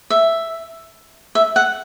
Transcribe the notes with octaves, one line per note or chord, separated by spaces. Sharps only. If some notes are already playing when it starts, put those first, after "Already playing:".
E5
E5
F#5